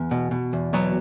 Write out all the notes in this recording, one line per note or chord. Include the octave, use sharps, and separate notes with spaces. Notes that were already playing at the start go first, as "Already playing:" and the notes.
Already playing: E2 B3
B2
B2
E2
B2 F#3 B3